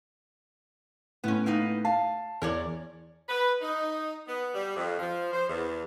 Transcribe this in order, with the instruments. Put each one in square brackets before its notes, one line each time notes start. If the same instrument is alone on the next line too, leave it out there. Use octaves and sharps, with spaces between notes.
[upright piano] A2 [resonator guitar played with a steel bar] B3 C#4
[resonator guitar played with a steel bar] A#3 B3 D#4
[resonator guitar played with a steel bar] F5 [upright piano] A5
[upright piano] E2 [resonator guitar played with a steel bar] A#4 C#5 D5
[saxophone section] B4
D#4
B3
G3
F2
F3
C5
E2